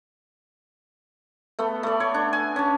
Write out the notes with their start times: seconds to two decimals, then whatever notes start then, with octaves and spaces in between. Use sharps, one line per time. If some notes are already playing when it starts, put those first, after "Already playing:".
1.59 A3 B3
1.83 A3 D5
2.00 C#5
2.14 D4
2.33 G#5
2.56 C#4 A5